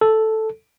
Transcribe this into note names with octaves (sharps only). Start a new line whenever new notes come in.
A4